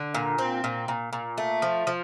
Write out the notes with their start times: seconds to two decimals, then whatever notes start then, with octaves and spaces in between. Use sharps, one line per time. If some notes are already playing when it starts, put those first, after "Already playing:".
Already playing: D3
0.14 A#2
0.38 C4
0.64 A#2
0.88 A#2
1.13 A#2
1.38 A3
1.62 F3
1.87 F3